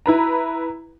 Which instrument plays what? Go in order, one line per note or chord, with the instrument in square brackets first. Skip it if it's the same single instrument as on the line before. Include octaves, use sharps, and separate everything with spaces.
[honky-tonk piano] E4 B4 A#5